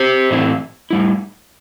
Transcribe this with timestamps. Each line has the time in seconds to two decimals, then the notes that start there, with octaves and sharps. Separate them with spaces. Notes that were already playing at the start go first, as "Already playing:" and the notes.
Already playing: G4 C5
0.31 A2 E3 C4 E4
0.91 A2 G3 E4